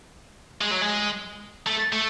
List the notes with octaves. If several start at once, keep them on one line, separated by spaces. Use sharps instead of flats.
G#3
F#3
G#3
A3
A3